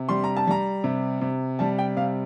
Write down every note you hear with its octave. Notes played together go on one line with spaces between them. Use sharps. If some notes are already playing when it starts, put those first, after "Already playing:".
Already playing: C3
G3 C6
A#5
A5
G3 A#5
C3
C3
G3 A5
G5
C3 F5